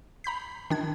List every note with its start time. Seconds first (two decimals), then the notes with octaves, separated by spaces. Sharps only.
0.24 A#5 B5 G6 B6
0.70 D#3 D4 G#6